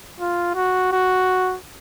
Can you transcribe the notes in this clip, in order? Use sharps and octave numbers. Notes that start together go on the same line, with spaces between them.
F4
F#4
F#4